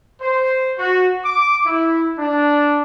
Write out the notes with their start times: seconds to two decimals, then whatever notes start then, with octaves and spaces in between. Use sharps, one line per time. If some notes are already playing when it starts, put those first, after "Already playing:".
0.21 C5
0.78 F#4
1.24 D6
1.65 E4
2.19 D4